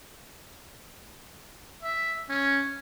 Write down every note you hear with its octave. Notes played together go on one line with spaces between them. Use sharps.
E5
C#4